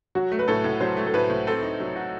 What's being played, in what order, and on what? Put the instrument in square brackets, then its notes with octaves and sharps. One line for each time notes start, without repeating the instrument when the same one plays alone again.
[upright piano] F#3 [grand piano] F#4
[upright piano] A3
[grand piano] B4
[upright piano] A2 [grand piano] A4
[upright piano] A2
[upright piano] F#3 [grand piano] C5
[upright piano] A3
[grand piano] A4
[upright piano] A2 [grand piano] B4
[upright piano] A2
[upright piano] C4 [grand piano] A4
[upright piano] D#4
F#3
F#4